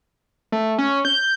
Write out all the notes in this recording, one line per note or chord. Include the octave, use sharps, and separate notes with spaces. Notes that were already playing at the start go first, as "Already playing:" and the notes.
A3
C#4
G6